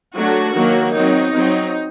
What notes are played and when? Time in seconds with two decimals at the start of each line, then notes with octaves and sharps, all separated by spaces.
0.15 F#3 A3 D4 F#4
0.54 D#3 F#3 A#3
0.94 F#3 C4 D#4
1.33 F#3 C4